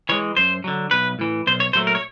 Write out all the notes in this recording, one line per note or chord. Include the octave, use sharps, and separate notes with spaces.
E3 G#3 C#5
F#2 C5
D3 F#3
B1 B4
A2 E3
B1 C5
C#5
A#2 F#3 A3 C5
A#4
C#5